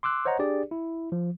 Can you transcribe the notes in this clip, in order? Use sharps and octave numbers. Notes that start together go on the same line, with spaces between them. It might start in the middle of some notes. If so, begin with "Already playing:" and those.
C6 D6 E6 F#6
C5 C#5 D#5 F#5 A#5
D4 G4 G#4 D5
E4
F3